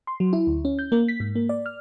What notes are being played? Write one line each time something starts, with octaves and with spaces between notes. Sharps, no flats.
C6
F#3
E4
D2
C#4
G6
A#3
B6
G#2
A#3
D5
F6